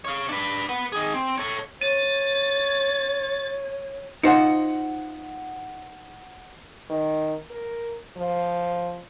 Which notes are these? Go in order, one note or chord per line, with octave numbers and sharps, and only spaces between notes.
C#5 F5
D4 B4
B4 F#5
D#3 G#4
C4
A4 C#5
C#5 A6 D#7
D#4 F4 C5 F#5 C#7
D#3
A#4
F3